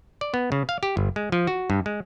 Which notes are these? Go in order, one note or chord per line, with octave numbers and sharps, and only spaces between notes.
D5
B3
C#3
F5
G4
G1
G#3
F3
F#4
G2
G#3